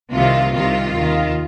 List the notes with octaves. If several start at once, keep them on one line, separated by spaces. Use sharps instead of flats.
C2 C3 D#3 F4
C2 C3 D#3 F4
D#2 D#3